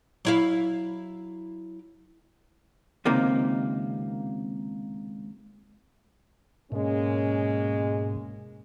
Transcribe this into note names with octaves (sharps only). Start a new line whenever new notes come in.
F#3 E4 F5
C#2 C3 D#3 A#3
G#2 B2 G#3 A#3 C#4